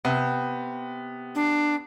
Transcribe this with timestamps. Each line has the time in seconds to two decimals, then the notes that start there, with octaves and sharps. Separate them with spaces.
0.05 C3 B3
1.35 D4